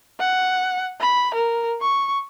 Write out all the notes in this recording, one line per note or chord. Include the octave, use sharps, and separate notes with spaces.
F#5
B5
A#4
C#6